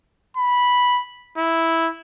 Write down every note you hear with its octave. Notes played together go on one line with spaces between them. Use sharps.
B5
E4